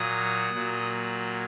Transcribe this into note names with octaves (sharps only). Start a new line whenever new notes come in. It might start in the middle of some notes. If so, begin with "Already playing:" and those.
Already playing: A#2 F#3 D#6
A#2 F#3